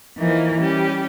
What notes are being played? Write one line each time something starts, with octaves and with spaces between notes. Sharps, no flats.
E3 F3 A#3 D#4
G3 C#4 G4